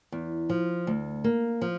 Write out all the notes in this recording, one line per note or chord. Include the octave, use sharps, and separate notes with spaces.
E2
F3
D2
A#3
F3